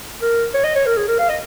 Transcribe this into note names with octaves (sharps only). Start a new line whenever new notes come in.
A#4
C#5
D#5
C#5
A#4
G#4
A#4
F5
D#5